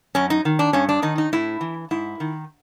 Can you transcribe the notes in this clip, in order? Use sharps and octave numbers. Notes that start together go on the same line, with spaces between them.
F#2 C#4
D#4
D#3
D4
G2 C#4
D4
D#3 D#4
D#4
A2 E4
E3
G#2 E4
D#3